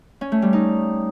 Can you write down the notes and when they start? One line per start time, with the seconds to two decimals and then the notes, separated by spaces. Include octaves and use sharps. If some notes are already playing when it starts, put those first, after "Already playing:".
0.21 C#4
0.32 A3
0.42 G3
0.53 D#4